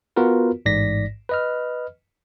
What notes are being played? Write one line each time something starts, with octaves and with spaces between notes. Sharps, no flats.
B3 F4 F#4 A#4 B4
A1 G#2 D5 A#6 B6
B4 D#5 F6